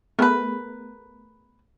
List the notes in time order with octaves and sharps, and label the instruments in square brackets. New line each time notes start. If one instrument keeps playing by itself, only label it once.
[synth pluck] A3 B3 G#4 [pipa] A#4 B4